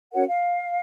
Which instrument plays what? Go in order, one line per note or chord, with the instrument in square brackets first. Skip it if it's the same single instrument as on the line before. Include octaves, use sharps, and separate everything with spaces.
[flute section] C#4 F#4 A#4 C#5 F#5
F5